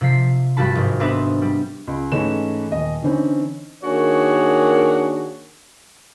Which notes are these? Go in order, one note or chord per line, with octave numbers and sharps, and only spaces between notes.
C3 F3 B6 C7
G1 F3 G3 F#4 A5 B5
G#1
B3 C4 D4 B4 E5 F#5
G3
C#2
G#2 E3 A3 C#4 E7
D#1 D#5
D3 E3 C4 C#4 D#4
D#3 A#3 D4 F#4 G#4 C#5